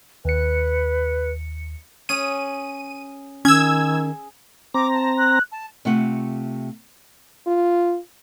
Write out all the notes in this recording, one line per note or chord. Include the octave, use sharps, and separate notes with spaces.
D#2 B4 C#7
C#4 G#4 D#7
D#3 C#4 G#4 E6 G#6
C4 A#5 D6
A5
F#6
A5
C3 A3 F4 F#5
F4